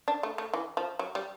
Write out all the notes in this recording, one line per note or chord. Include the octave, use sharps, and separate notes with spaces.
D4
A3
A3
E3
F3
F#3
G3